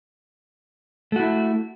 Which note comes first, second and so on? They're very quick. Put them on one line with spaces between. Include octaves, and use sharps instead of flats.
A3 F#4 E4